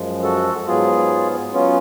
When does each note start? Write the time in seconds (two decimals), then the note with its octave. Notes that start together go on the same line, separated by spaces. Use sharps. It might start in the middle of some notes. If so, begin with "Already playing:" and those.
Already playing: F#2 F3 G#3
0.23 F#4 A4
0.67 G#2 F#3 B3 F4 G#4
1.53 F#3 B3 C#4 F4